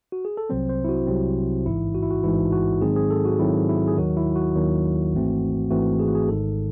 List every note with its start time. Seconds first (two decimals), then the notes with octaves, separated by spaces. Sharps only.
0.12 F#4
0.25 G#4
0.37 A4
0.50 C2 C3 F#3 C4 C5
0.69 C5
0.84 E4
0.89 F#4
1.07 C2 C3 F#3 C4
1.66 A1 G#2 E3 E4
1.95 F#4
2.03 E4
2.11 F#4
2.24 A1 G#2 E3 E4
2.52 F#4
2.81 G#2 D#3 F#3 C4 G#4
2.96 G#4
3.10 A4
3.25 F#4
3.39 G#2 D#3 F#3 C4 E4
3.69 E4
3.88 G#4
3.97 D#2 D#3 F#3 F#4
4.17 E4
4.36 F#4
4.55 D#2 D#3 F#3
5.13 G#1 G#2 E3 A3 C4
5.71 G#1 G#2 E3 A3 C4 F#4
5.99 G#4
6.08 F#4
6.15 G#4
6.28 G#1 G#2 D#3 A4